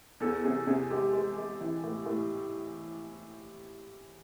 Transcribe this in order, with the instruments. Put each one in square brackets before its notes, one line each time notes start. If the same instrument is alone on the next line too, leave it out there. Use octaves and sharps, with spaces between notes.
[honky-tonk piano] E2 [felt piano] A4
[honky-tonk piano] C3 [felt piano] G#4
[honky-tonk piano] C3 [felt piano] G#4
[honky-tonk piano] G#3 [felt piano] G4
[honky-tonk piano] G#3
G#3
E3
A2
A2